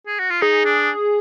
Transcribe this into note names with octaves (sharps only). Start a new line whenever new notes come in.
G#4
F#4
F4
D#4 G#4
D4